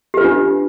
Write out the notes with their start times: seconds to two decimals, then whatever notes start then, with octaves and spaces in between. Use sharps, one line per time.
0.14 G4
0.17 B4
0.21 F4
0.24 D4